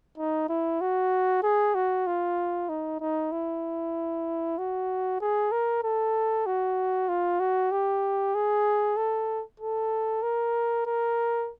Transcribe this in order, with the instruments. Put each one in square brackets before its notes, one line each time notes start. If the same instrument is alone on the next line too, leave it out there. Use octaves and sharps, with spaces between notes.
[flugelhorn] D#4
E4
F#4
G#4
F#4
F4
D#4
D#4
E4
F#4
G#4
A#4
A4
F#4
F4
F#4
G4
G#4
A4
A4
A#4
A#4